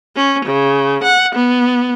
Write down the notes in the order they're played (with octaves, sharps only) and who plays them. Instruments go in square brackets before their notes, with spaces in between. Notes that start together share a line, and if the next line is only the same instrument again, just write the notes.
[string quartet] C#4
C#3
F#5
B3